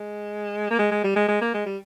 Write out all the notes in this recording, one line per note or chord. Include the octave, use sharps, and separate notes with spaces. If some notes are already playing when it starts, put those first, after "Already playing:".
Already playing: G#3
A#3
G#3
G#3
G3
G#3
G#3
A#3
G#3
G3